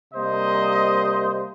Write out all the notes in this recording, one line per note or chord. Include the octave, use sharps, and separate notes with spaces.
C3 G3 A#3 C5 D#5